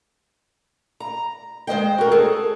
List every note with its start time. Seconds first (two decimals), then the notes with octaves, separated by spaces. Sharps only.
1.00 A#5
1.67 G#3 C5 D#5 G5
1.98 F#4 A#4
2.11 G#4 A4